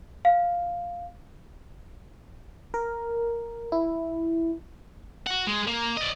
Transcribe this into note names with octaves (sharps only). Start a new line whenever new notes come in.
F5
A#4
E4
F#4 F#5
G#3
A#3
D5 D#5